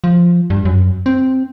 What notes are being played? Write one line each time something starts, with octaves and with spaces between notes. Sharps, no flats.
F3
G2
F#2
C4